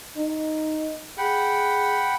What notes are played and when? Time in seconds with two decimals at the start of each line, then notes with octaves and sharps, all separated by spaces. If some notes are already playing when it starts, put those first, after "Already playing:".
0.16 D#4
1.18 G#4 F#5 G5 B5